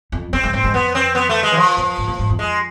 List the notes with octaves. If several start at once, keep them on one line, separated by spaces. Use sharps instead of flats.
F2
F2 C4
G#2
A2 C4
G#2
F2 B3
C4
B3
A3
G#3
E3
F3
F2
G#2
A2
G#2
F2
G#3